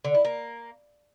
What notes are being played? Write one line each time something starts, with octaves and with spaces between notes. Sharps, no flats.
D3
E4
A#3